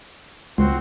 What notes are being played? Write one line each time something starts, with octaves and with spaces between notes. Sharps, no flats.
C#2 C4 F#4 C6